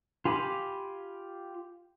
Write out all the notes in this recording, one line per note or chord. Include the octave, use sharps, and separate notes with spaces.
F4 G4 G#5 B5 D6